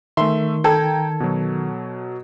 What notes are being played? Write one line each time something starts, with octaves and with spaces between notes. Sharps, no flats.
D#3 A3 E5 C6
A4 G5 A#5 G#6
B2 F#3